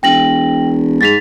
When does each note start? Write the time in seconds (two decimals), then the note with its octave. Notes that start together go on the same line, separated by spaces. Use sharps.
0.03 E1 G5 A#6 F#7
1.01 G#2 A6 B6 F7